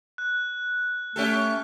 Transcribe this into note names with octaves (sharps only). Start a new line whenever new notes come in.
F#6
A3 C#4 G4 A4